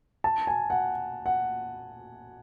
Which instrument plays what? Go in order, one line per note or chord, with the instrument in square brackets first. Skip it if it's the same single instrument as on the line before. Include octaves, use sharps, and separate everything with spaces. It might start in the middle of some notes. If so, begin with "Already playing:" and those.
[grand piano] A5
G#5
F#5
F#5